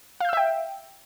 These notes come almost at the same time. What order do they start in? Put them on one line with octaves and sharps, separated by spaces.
F5 G6 E6 E5 G5